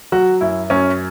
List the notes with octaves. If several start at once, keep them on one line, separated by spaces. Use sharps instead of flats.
F#3 F#4
F#2 E4
F#2 C#4